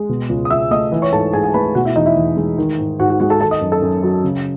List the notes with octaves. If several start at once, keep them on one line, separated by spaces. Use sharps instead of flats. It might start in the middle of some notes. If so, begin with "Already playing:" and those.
Already playing: G#3
B2
C#2
D#6
C#2 E5 E6
A3 D#5 D#6
E3
C#5 C#6
G#2 A4 A5
G#2 G#4 G#5
G#4 G#5
A3 B4 B5
B2 F#4 F#5
E4 E5
E2 D#4 D#5
E4 E5
E2
G#3
D#3
G#2
G#2 F#4 F#5
F#4 F#5
G#3 F#4 F#5
A4 A5
D#3 A4 A5
D#5 D#6
F#2
A4 A5
F#2
F#3
C#3